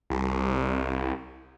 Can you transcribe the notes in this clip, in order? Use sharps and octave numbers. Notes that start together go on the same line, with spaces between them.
C2